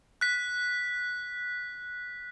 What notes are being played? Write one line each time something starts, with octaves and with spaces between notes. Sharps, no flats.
F#6 B6